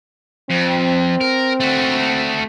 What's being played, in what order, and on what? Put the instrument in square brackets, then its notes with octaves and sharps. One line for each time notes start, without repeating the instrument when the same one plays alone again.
[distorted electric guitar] F2 [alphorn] C4
[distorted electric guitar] A#4
A3 F#4